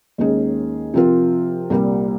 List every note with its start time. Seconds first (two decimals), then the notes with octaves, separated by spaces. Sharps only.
0.18 D#2 D#3 G#3 C#4 G#4
0.94 C3 F3 C4 F4 A#4
1.70 C2 A#2 G3 A#3